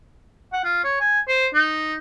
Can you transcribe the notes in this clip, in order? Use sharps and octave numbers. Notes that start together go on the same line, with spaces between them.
F#5
F4
C#5
G#5
C5
D#4